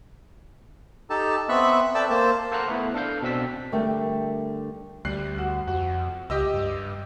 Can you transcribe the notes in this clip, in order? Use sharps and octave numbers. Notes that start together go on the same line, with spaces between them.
D#4 G4 A4 A5
B3 C4 E5 B5 C#6 F#6
A4 D5 E5 G5 A5 E6
A#3 C5 A5
A4 C5 F5 F#5 A#5 F#6
A3 B3 E4
D4 A4 F5 G6
B2 C4 D4 E6 B6
D3 G3 A3 A#4 E5 G5
D2 G3 F#6 C7
F#4
F2 F#4
C#2 G4 D#5 E6
G2